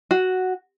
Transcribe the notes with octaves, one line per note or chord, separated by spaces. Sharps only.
F#4